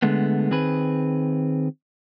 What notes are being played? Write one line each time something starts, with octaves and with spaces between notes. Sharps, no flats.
D3 G#3 A3 B3
D#3 C4 G#4 B4